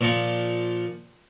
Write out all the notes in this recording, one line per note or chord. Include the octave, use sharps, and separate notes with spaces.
A#2 F3